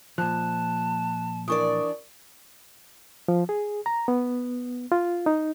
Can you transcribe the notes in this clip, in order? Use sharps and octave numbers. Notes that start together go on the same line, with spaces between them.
A#2 F3 A5 F#6
E3 D4 A#4 D5 C#6 D#6
F3
G#4
A#5
B3
F4
D#4